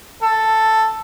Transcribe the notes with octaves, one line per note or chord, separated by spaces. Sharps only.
A4